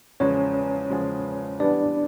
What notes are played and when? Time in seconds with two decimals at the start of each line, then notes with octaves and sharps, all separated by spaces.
0.20 E2 C#3 F3 G#3 C#4 C#5
0.90 E2 C#3 F3 G#3
1.60 E3 G3 B3 D4 D5